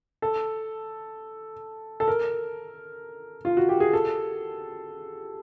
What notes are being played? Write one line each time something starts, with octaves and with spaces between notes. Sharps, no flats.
A4
A4
A#4
F4
F#4
G4
G#4
A4